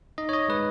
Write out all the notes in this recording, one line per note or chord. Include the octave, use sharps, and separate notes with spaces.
D#4 D#5
C#5
D#5
G#3 B4